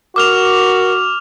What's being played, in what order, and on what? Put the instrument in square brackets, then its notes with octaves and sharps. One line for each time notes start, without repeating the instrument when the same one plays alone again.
[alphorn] F#4 [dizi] A#4 [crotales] D6 F6 F7